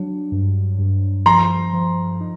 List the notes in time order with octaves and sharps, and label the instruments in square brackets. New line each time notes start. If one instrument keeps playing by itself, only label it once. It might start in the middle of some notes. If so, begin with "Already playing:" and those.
Already playing: [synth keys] F#3 D4
G2
G2
[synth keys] F3 [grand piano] A#5 C6
[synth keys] F3
D#4